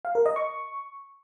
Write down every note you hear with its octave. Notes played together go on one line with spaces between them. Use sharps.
F5
A#4
D#5
C#6